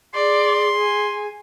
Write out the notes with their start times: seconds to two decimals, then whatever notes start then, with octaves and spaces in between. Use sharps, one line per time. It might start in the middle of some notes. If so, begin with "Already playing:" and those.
0.14 G#4 D5 C6
0.77 G#5